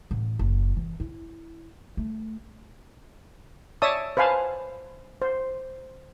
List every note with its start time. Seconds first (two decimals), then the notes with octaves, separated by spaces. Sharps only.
0.11 A1
0.39 F#1
0.77 E3
1.00 E4
1.97 A3
3.82 C#5 D5 E5 A5 D#6 E6
4.17 B4 C5 F5 G#5 A5
5.22 C5